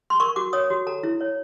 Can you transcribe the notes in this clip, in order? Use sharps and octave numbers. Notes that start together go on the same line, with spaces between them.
C6
A#4 C#6
F#4 D6
C#5 D#6
F#4
A4 A#5
E4
C#5